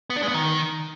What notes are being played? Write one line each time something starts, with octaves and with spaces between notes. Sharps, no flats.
B3
D4
G#3
B3
D#3